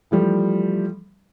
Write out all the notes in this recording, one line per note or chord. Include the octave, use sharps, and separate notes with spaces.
E3 F3 G3 A3